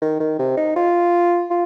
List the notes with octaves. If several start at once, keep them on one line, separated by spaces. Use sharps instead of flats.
D#3
D#3
C3
D#4
F4
F4